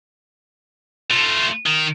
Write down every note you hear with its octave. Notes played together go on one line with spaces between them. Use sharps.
A3 F4
D#3